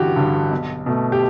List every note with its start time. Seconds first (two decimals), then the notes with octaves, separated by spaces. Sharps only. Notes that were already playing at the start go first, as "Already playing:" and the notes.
Already playing: A1 G2 D3 F#4 G4
0.16 G2 D3
0.51 B1
0.86 B2 A3
1.12 G4